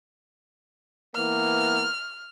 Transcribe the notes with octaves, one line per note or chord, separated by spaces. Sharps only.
E3 A#3 B3 F6